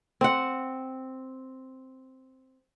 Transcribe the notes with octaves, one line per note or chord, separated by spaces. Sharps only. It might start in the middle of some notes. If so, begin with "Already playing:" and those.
C4 F#5